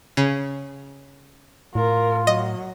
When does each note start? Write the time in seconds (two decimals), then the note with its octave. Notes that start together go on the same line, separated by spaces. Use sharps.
0.17 C#3
1.75 A2 F4 A#4
2.27 F#3 D#5